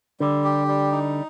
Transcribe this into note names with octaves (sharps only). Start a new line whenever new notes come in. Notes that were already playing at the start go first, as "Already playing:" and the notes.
D3 G3
G4
G3
D#4